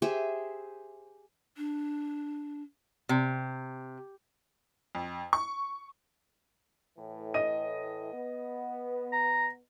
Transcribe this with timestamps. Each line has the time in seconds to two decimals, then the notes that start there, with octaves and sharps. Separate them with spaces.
0.02 G4 G#4 C5 E5
1.57 D4
3.09 C3
4.95 F2
5.33 C#6
6.98 A2 E3
7.34 D#5 D#7
8.13 B3
9.12 A#5